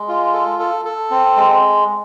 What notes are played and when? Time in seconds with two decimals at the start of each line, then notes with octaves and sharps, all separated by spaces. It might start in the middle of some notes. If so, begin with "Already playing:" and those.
Already playing: G#3
0.08 F4
0.33 A4
0.59 A4
0.85 A4
1.11 C4
1.37 G#3